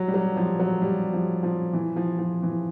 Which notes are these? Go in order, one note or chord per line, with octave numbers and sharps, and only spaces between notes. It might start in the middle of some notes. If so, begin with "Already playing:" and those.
Already playing: F#3
G3
F#3
F3
F#3
G3
F3
F3
E3
F3
F3
E3